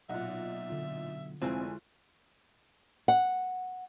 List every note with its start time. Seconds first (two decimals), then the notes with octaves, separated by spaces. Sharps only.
0.09 B1 A#2 D#4 E5 F#5
0.70 D3 F4
1.42 F1 G#3 C4 E4 F4 G#5
3.08 F#5